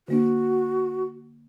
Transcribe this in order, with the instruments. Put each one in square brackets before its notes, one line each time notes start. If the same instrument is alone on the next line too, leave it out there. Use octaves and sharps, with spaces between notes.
[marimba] D3 A#3 D4 [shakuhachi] F#4